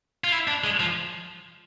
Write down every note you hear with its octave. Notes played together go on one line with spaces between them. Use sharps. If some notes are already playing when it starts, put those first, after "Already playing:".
F4
E4
D4
G#3
F3